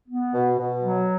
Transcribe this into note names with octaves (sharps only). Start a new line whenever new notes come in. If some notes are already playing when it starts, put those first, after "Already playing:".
B3
B2
B2
F#3